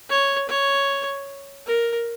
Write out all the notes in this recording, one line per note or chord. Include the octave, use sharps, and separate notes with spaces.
C#5
C#5
A#4